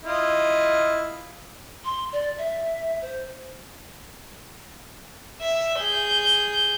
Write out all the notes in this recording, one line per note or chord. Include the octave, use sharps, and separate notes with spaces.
E4 F4 D#5
C6
D5
E5
C5
E5
G#4 G6